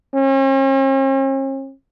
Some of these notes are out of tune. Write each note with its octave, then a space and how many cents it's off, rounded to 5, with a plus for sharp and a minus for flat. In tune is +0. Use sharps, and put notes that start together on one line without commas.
C#4 -45